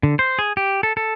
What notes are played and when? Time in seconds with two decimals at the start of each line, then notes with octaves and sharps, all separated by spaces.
0.03 D3
0.19 C5
0.39 G#4
0.57 G4
0.83 A4
0.97 A4